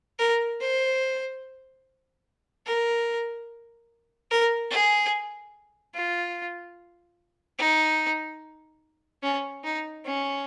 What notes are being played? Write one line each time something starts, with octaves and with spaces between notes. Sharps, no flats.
A#4
C5
A#4
A#4
G#4
F4
D#4
C#4
D#4
C#4